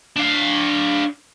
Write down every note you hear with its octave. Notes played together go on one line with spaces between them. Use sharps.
D4 F5